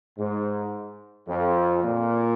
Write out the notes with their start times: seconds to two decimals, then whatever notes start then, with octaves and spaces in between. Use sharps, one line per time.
0.18 G#2
1.27 F2
1.82 A#2